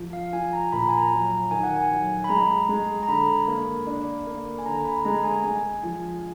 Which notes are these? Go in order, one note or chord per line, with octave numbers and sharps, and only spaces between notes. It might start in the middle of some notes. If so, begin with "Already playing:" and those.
Already playing: F3
F5
F3 G#5
A#5
A#2 B5
A#5
G#5
A#5
F#3
D#3 G#5
F#5
G#5
F#3
B5
G#3 A#5
G#3
A#5
D3 B5
A#3
D4
A#3
G#5
D3 A#5
B5
G#3 A#5
G#5
G#3 G#5
F3